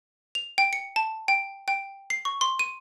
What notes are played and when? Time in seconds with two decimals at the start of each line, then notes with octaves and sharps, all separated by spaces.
0.35 F7
0.58 G5
0.73 C#7
0.96 A5
1.28 G5
1.68 G5
2.10 C7
2.25 C#6
2.41 C6
2.59 D#7